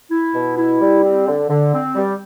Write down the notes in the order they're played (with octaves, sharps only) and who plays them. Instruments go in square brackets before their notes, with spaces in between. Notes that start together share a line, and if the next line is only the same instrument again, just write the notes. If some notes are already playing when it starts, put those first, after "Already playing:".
[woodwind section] E4
B2
E4
G3
C4
D3
D3
C4
G3